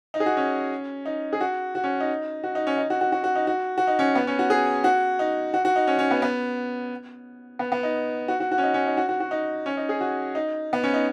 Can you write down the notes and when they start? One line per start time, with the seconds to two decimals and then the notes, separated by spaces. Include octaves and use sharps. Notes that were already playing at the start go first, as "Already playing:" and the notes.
0.14 D#4
0.20 G#4
0.26 F#4
0.37 C#4
1.06 D#4
1.33 G#4
1.41 F#4
1.75 F#4
1.84 C#4
2.00 D#4
2.44 F#4
2.55 D#4
2.67 C#4
2.78 D#4
2.90 F#4
3.01 F#4
3.12 F#4
3.24 F#4
3.35 D#4
3.47 F#4
3.78 F#4
3.87 D#4
3.99 C#4
4.15 B3
4.27 C#4
4.39 F#4
4.50 G#4
4.84 F#4
5.19 D#4
5.54 F#4
5.65 F#4
5.76 D#4
5.87 C#4
5.99 C#4
6.11 B3
6.22 B3
7.59 B3
7.72 B3
7.83 D#4
8.28 F#4
8.40 F#4
8.52 F#4
8.58 C#4
8.63 D#4
8.74 C#4
8.86 D#4
8.97 F#4
9.09 F#4
9.20 F#4
9.31 D#4
9.66 C#4
9.77 D#4
9.89 G#4
10.01 F#4
10.35 D#4
10.73 B3
10.83 C#4
10.94 D#4